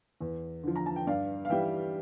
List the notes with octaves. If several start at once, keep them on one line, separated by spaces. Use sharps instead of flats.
E2
D3 F3
A#5
A5
G5
G2 D5 F5
F5
E3 G3 E5 G5